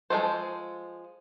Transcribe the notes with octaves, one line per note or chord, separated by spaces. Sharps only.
F3 G#3 A3 A4 C5